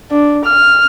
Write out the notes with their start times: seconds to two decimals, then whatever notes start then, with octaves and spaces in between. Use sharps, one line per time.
0.11 D4
0.45 F6